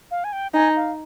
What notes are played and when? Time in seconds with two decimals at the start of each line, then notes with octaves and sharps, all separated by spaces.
0.11 F5
0.24 G#5
0.32 G5
0.54 D#4 G#5
0.76 F5